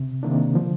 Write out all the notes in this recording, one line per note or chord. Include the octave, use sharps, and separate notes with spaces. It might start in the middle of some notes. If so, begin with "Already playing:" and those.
Already playing: C3
C3 D#3 A#3 D4
D3 F3